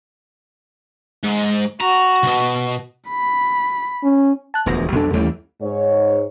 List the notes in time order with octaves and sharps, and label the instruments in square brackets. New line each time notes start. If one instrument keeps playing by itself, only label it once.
[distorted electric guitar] G#2
[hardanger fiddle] F#4 [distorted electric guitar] A#5
[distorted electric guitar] C2 B2
[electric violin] B5
[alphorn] C#4
[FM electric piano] A5 F#6
[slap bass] E1 D2 F3 [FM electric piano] B3 A#6
[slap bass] B1 F2 D4 [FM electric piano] B2 A4
[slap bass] D#2 E3 G3 [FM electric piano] A3 C#4 E4
[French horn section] G#2 C#5